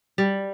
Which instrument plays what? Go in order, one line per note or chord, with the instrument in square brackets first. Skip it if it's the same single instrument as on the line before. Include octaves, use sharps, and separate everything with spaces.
[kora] G3